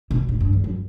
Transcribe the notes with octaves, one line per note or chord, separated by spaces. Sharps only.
B2
A2
G2
E2
F#2